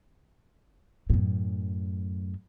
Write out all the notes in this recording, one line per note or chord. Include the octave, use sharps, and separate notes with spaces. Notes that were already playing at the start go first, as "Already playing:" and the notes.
F#2 A2